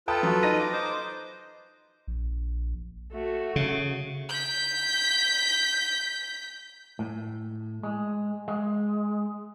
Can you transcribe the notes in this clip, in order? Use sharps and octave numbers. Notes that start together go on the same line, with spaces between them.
F4 A4 B4 G5 A5 D#6
F#3
D#4 A#6 D#7
D6
C5 D#5 D6
A#1
A3 F#4
C#3
G6 B6
A2
G#3
G#3